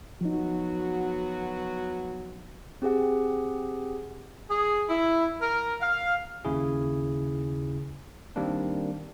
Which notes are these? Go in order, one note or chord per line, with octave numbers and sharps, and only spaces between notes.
F3 F#3 B3 D#4 F#4
C4 G4 G#4 F#5
G#4
E4
A#4
F5
D#2 C#3 E4 G#4
D#3 G3 A#3 C4 D4